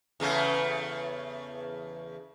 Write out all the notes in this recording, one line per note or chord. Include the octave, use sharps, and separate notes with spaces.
E2 C#3 A3